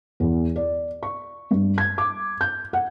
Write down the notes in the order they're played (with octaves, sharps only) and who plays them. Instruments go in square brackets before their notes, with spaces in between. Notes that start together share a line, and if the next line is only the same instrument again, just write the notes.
[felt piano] E2
D5
C#6
G2
G#6
D6
G6
F#5